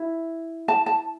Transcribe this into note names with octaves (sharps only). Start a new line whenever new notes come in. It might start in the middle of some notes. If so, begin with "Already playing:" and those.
Already playing: E4
A5
A5